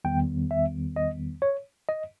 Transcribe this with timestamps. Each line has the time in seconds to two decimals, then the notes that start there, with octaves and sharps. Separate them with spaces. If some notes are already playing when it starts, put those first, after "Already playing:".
0.05 E2 D#3 G3 B3 G5
0.51 E5
0.96 D#5
1.42 C#5
1.89 D#5